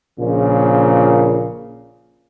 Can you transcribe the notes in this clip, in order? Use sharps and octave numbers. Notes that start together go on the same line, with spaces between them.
A#1 A#2 C#3